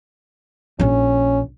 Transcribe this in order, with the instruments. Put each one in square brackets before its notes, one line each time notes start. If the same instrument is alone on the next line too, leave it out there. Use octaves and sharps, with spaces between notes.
[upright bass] A#1 D4 [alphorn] C#4